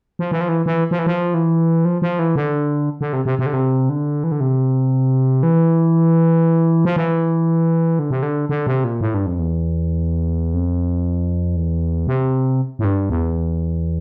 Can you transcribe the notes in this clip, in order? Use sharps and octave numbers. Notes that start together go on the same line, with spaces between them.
F3
E3
F3
E3
E3
F3
E3
F3
E3
F3
F3
E3
D3
D3
C3
C3
C3
D3
C3
D3
E3
D3
C3
E3
F3
E3
D3
C3
D3
D3
C3
A#2
A2
G2
F2
E2
F2
E2
C3
A2
G2
E2